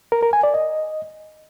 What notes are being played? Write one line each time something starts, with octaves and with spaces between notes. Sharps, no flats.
A#4
A#4
G#5
D5
D#5